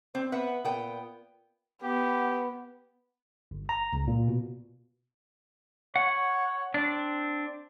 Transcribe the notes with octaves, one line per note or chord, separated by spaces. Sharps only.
C4 C5
B3 B4 E5 F#5
A#2 B3 G5
B3 G4
G1
A#5
C#2
A#2
B2
C#5 F#5
C4 D4